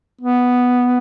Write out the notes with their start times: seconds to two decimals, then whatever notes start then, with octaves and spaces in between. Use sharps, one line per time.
0.21 B3